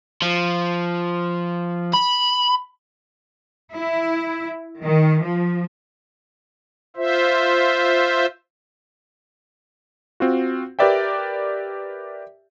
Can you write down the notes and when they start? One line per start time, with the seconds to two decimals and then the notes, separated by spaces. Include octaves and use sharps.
0.22 F3
1.93 B5
3.77 E4
4.82 D#3
5.24 F3
6.96 F4 C5 E5
10.20 C4 F4 F#4
10.79 G4 A#4 B4 D5 E5 G5